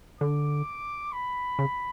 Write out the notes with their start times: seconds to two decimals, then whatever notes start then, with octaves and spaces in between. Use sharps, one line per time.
0.20 D3 D6
1.12 B5
1.59 C#3